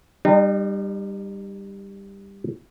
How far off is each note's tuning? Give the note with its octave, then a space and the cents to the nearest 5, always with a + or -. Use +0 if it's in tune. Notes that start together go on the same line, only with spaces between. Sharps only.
G3 +10 D#4 -35